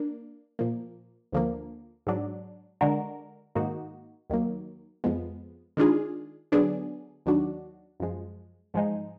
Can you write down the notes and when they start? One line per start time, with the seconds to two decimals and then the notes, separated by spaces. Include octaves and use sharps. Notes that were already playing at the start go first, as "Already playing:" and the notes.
Already playing: A#3 D4
0.59 A#2 F3 A#3
1.32 D2 D3 F3 A#3
2.07 G#2 F#3 D4
2.81 D3 G#3 D4 F#4 A#4
3.55 G#2 D#3 A#3 D#4 F#4
4.30 D#2 D#3 F#3 A#3
5.04 F2 F3 G#3 B3
5.77 D#3 G#3 D4 F4 G#4
6.52 D3 F#3 B3 D4 G#4
7.26 D#2 D#3 F#3 D4 F#4
8.00 F#2 F3 G#3
8.74 G#2 F3 G#3 D#4